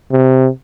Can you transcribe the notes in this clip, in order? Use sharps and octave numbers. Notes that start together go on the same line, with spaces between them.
C3